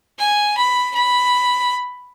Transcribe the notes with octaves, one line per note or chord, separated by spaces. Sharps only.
G#5
B5
B5